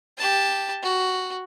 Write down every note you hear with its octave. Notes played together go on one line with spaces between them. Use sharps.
G4 A5
F#4